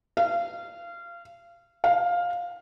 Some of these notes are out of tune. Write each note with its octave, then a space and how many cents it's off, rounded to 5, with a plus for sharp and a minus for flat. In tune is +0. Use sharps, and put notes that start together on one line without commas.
F5 -25
F5 +10